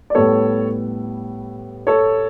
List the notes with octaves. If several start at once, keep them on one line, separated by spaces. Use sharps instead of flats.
D5
A2 G3 B3 A4 C#5
A4 C#5